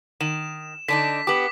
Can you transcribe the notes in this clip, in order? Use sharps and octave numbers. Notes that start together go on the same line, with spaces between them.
D#3 E7
D3 D4 D#4 B6
B3 G4 D6